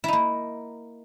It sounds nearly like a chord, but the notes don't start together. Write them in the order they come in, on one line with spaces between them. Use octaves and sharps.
E4 D#4 A#3